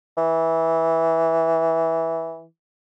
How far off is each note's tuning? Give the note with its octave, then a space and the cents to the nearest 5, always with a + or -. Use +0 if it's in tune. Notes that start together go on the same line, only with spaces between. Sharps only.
E3 -10